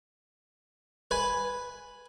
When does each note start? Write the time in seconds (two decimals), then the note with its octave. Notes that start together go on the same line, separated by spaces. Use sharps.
1.11 B4 G#5